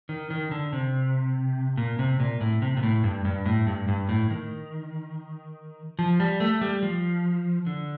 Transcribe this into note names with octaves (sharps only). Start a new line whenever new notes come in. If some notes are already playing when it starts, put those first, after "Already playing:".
D#3
D#3
D3
C3
A#2
C3
A#2
A2
C3
A#2
A2
G2
G2
A2
G2
G2
A2
D#3
F3
G3
A3
G3
F3
D3